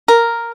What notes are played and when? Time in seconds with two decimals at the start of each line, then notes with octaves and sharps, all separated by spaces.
0.08 A#4